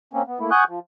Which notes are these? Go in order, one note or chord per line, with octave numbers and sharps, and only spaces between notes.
A#3 C4 C#4
B3
A3 A#3 E4
F#5 G#5 C#6 D#6 F#6 G6
F3